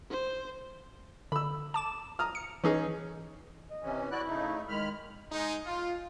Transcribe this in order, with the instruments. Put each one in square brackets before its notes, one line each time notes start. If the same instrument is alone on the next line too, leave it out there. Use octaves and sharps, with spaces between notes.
[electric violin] C5
[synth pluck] D3 [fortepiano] B5 E6
[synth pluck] A5 D6 E7
[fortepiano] A#5 D#6 F6
[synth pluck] C#7
[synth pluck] E3 [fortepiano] C#4 D#4 G#4
[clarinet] D#5
[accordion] C3 E3 C#4
[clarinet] E4 [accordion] F#4 D5 F#6
[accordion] C#3 A3 D#4
[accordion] D#3 B5 F6 [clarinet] G#3
[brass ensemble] G#3 D#4
F4